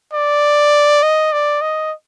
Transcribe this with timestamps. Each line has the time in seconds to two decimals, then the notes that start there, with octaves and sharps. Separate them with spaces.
0.13 D5
1.03 D#5
1.32 D5
1.61 D#5